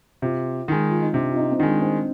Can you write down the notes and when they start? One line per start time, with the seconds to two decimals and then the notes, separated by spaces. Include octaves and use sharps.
0.22 C3 F4
0.68 D#3 G#3
0.90 F4
1.02 D#4
1.13 C3 D4
1.31 F4
1.36 D#4
1.51 C4
1.59 D#3 G#3 D4
1.81 C4